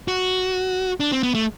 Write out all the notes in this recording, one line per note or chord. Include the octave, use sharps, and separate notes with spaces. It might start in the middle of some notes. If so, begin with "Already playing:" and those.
F#4
D4
C4
B3
A3